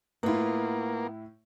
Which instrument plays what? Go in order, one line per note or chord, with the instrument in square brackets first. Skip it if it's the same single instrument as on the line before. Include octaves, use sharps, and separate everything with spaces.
[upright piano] A2 E4 [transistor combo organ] A#3 [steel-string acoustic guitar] B3 F4